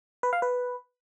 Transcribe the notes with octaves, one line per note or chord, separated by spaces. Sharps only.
B4
F5
B4